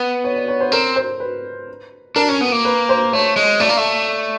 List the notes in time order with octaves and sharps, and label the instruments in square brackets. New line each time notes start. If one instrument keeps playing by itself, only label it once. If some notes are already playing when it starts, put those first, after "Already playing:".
Already playing: [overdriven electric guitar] B3
[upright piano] C#5
D5
C#5
C5
[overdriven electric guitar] C4 [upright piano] A#4
[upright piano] C5
B4
[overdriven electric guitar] D4 [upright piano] A#4
[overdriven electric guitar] C#4
B3
A#3
[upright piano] B4
C5
[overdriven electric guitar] A3 [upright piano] C#5
[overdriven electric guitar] G#3
[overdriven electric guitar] A3 [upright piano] D5
[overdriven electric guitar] A#3
A3